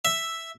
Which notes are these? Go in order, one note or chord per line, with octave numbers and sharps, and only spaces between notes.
E5